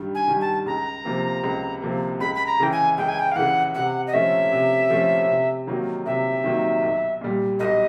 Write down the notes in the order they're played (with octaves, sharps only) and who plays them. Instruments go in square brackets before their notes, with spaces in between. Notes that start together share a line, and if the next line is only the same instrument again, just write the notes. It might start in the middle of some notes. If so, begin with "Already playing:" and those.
Already playing: [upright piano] G2 D#3 G3
[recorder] G#5
[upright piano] D#3 G3
[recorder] A5
[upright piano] C#2 [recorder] A#5
[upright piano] C3 F3 A#3
C#2
C3 F3 A#3
[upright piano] C#2 [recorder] B5
[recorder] B5
A#5
[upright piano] C#3 E3 [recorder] G5
[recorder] G#5
[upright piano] C#2 [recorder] G5
[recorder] G#5
G5
F5
[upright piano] C#3 E3 [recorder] F#5
[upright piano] C3 [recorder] F#5
[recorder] D#5
[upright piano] F3 A3 C#4 [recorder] E5
[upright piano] C3
F3 A3 C#4
C3
D#3 F#3 A#3 D#4
[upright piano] C3 [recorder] E5
[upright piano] D#3 F#3 A#3 D#4
B1
A#2 G3
[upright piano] B1 [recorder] D#5